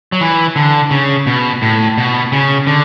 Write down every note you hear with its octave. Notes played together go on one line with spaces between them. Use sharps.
F#3
E3
D3
C#3
B2
A2
B2
C#3
D3